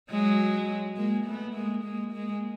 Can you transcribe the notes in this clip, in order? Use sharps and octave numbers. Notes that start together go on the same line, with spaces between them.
F#3 G#3
G#3 A#3
A3 B3
G#3 A#3
G#3 A#3
G#3 A#3